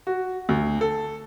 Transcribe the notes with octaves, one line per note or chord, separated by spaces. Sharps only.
F#4
D2
A4